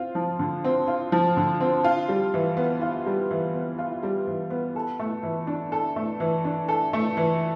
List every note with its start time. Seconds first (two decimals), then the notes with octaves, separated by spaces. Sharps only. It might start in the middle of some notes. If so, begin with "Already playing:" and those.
Already playing: C4 F4
0.15 F3
0.39 D3
0.64 C4
0.88 F4
1.12 F3
1.37 D3
1.61 C4
1.84 F4
2.09 G3
2.34 E3
2.57 B3
2.81 F4
3.06 G3
3.31 E3
3.54 B3
3.78 F4
4.03 G3
4.27 E3
4.50 B3
4.76 A4
4.99 A3
5.23 E3
5.47 D4
5.72 A4
5.96 A3
6.20 E3
6.45 D4
6.68 A4
6.93 A3
7.17 E3